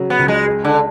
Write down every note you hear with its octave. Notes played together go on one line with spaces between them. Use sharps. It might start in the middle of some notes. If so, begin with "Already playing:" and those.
Already playing: C#3 F#3
B3
C#2
G#3
G#3
D3